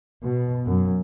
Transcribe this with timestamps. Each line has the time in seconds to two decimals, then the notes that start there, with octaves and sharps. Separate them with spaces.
0.23 B2
0.66 F#2